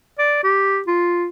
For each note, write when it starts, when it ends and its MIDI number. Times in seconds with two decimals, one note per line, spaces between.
0.19 0.40 74
0.43 0.80 67
0.87 1.28 65